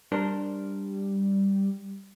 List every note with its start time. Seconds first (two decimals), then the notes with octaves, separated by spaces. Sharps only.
0.12 G3 D4 A#4 C5